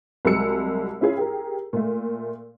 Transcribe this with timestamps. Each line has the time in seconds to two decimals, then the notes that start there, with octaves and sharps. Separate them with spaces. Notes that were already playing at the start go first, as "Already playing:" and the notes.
0.25 C2 F#3 G#3 E6 C#7
1.01 C#4 E4 F4 G#4
1.17 G4 G#4 A#4
1.73 A#2 A3